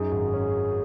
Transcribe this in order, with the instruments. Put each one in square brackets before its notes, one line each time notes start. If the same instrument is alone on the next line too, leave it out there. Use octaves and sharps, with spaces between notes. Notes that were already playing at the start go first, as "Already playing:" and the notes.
Already playing: [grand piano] F#2 D#4 [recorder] G#4
[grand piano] G#1
C#4